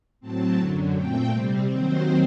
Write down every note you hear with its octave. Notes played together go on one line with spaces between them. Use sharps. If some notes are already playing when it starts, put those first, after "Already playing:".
A2 F#3 C4 A5
F#2 D3 F#3
A#2 A3 C4 G5
C3 G3 C4
D#2 D#3 F#3 C4 C5